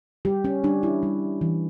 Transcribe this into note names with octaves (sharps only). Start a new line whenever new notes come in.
G3 G4
C#4
G3 D4
E4
G3
E3